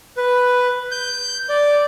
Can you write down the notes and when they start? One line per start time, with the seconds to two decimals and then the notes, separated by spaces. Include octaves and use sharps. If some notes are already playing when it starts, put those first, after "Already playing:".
0.17 B4
0.91 G6
1.49 D5